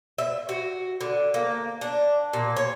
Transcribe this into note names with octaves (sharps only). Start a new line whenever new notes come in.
E5
F#4
D3
A#3
D4
A#2
C#5